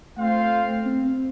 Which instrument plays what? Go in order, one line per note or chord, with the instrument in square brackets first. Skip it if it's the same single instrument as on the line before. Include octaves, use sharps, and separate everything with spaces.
[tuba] A3 [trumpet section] C4 F4 C5 F5
[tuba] C4